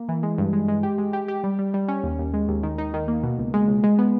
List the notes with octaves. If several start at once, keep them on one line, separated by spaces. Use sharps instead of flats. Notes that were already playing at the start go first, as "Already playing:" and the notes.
Already playing: A#3
E3
G#3
G2
G#3
G#3
G4
G#3
G4
G4
G3
G3
G3
C#4
D#2
D#2
G#3
D#2
D#3
D#4
D#3
A#3
B2
C#2
G#3
C#2
G#3
B3